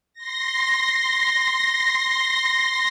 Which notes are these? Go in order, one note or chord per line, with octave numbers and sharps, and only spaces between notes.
C6 A#6